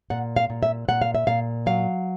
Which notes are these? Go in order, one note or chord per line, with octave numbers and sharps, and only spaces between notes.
A#2 F#5
F5
A#2
E5
A#2 F#5
F5
E5
A#2 F5
F#3 F5